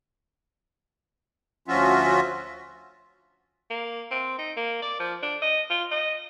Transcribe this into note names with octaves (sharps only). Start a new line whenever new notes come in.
D2 F3 C#4 F4 F#4 E5
A#3
C4
D#4
A#3
D5
F3
D4
D#5
F4
D#5